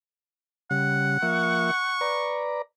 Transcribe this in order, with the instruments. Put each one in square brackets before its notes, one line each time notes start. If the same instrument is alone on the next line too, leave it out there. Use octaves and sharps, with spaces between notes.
[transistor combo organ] C#3 G3 [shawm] F#5
[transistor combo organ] F3 A#3 E5 [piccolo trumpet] C#6
[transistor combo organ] B4 D5 A#5